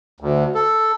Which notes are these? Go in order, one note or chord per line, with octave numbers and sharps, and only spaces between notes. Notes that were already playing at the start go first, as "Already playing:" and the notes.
D2
A4